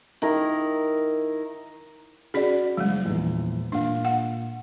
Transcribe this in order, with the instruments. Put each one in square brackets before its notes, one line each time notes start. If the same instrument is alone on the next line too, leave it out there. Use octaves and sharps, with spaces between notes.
[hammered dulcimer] D#3 E4 A#4
[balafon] C#4 G#4 [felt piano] F#4 D5
[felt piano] F#1 [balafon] G3 G#3
[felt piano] A#1 E2
[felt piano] A#2 F5 [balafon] D4
[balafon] F#5